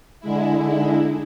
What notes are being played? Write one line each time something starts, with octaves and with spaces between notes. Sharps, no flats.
D3 G#3 E4
D#4